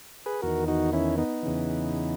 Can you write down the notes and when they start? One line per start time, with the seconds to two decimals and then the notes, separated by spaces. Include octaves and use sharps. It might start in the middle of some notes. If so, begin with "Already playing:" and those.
0.26 G#4 B4
0.42 E2 D#3 F#4 A#4
0.68 D#4 F#4
0.93 C#4 E4
1.18 B3 D#4
1.43 E2 C#3 E3